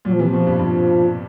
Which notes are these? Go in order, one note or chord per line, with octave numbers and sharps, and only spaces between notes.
A#2 F#3
F3
C3 E3
F3
B2
G2
G2